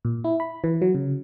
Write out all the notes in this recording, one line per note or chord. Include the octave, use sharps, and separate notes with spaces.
A#2
E4
B5
E3
F#3
C#3